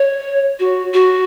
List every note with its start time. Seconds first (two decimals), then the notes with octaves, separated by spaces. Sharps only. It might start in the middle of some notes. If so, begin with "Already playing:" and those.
Already playing: C#5
0.59 F#4
0.93 F#4